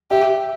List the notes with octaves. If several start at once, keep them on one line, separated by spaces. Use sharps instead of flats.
G4 E5